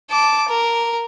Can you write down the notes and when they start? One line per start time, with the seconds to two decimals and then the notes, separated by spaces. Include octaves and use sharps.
0.10 A5 D6
0.48 A#4